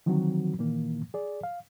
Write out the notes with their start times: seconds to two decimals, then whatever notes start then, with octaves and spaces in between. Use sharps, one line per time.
0.06 D3 D#3 F3 F#3 C4 F#4
0.59 A#2 D#3 E3 A#3
1.14 G#4 D5
1.43 F5